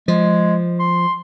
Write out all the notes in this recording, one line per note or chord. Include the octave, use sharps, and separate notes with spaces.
F3 G#3
C6